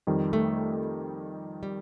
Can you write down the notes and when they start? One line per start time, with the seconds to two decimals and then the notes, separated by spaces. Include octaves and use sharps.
0.07 F2 D#3 G3
0.33 A3
1.63 G3